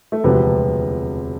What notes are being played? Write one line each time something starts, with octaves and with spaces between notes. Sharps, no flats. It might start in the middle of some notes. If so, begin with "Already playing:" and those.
A3
E1 D2 C3 F3 B3